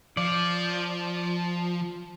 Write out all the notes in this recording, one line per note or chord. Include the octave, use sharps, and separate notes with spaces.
F3 D5